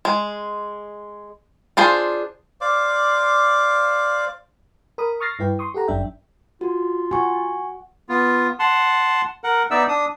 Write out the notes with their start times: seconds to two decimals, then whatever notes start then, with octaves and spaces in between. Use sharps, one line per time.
0.05 G#3
1.77 D4 F4 G#4 C5
2.61 C5 D5 F5 D6
4.98 A#4 B5 D#6
5.20 C#6 D#6 F6 A6 A#6 C7
5.39 G2 E4 B4 G5
5.59 C6 C#6 D#6
5.74 G4 A4 F#5 A#5
5.88 G1 F#2 D4 E5 G5
6.61 F4 F#4
7.11 F#4 G#5 C#6
8.09 B3 F4
8.59 F#5 A5 C6
9.44 A#4 F#5
9.71 B3 D#4 D5 E5 E6
9.88 D4 D#6